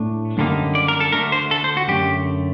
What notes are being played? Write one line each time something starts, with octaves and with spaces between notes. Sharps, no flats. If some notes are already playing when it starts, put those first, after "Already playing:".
Already playing: A2 A3 D4
F#2 D3 G3 A#3 D#4
D5
A#4
A4
D2 D3 A3 A#4
C5
A4
C5
F#4
F#2 D3 A3 G4